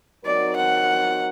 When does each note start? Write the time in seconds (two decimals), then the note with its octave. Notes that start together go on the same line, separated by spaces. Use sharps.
0.25 F#3 C4 D#4 F#4 A#4 D5
0.56 F#5